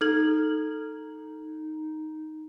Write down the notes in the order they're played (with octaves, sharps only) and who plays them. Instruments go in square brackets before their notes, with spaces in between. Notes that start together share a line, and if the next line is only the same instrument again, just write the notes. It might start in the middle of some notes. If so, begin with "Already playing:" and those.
[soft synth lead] D#4 [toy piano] A4 [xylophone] F6 G#6 F#7